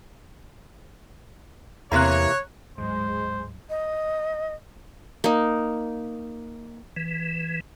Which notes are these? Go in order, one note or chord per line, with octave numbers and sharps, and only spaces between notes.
E2 C3 E3 A#3 C#5 A#5 F#6
D1 G#2 F#3 G#3 C5
D#5
A#3 D#4
E3